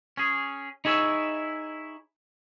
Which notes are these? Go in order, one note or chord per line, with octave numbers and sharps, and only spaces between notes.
C#4 G#4
D#4 E4 G#4 C#5 D#5 E5